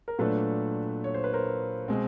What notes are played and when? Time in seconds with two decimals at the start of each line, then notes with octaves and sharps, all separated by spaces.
0.08 A#4
0.19 A#2 F#3 A3 D4 A4 B4
1.04 C#5
1.14 C5
1.24 B4
1.33 A#4 C5
1.88 B2 G#3 C4